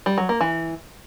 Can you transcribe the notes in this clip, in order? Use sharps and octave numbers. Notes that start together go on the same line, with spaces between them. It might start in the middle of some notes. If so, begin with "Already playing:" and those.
G3
F#3
A#3
E3